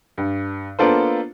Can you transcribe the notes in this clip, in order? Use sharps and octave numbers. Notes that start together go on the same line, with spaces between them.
G2
A#3 B3 D4 F4 A4 C5